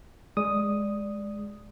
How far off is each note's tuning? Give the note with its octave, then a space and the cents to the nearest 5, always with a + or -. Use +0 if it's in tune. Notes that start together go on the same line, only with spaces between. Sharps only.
G#3 +0 D5 +0 D#6 +0